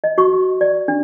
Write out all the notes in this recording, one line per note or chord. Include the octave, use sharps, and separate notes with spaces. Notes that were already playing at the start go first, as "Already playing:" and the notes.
D#5
F#4 C#6
D5
D4